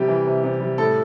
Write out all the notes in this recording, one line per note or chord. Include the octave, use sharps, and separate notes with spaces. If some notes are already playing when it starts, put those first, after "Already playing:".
Already playing: C3 G3 G4
E3
C3
C3
G3
A2 A4